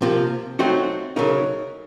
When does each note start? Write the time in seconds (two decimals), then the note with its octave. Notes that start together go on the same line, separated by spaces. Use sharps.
0.02 C3 F3 A#3
0.59 F#3 A3 C4 D#4 F#4
1.16 C#3 F#3 A3 D#4 A#4